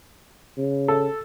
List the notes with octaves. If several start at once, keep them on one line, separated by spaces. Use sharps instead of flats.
C#3
A4